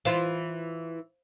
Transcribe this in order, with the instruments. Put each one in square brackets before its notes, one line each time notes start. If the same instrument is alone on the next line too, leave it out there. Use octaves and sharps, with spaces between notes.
[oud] E3 F4 [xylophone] C5 F5 E7